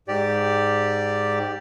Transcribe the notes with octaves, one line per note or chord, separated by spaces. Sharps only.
G#2 G4 D5